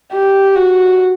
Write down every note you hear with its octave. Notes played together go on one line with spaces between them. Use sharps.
G4
F#4